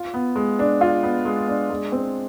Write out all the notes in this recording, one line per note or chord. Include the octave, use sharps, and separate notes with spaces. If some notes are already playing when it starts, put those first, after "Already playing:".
Already playing: F4
B3
G#3
D4
F4
B3
G#3
D4
G#3
C4